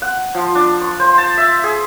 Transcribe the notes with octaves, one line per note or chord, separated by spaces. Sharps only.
F#5
F3
D4
C#6
C5
A5
E5
G#4